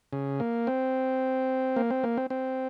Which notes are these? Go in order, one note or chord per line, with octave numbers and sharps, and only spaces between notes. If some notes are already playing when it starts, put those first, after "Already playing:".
C#3
A#3
C4
A#3
C4
A#3
C4
C4